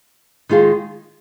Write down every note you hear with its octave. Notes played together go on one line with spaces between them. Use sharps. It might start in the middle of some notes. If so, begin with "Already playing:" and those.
D#3 G#3 F4 G#4